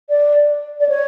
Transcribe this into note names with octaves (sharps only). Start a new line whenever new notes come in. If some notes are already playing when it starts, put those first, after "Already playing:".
D5
D5
C#5